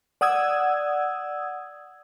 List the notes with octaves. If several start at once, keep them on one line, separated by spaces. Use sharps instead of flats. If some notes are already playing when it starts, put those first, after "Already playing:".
D5 F#5 D#6 E6 G#6